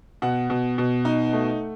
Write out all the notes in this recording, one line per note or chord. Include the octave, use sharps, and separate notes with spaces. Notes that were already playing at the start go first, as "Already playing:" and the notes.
B2 F#5
B2
B2
D#4
A3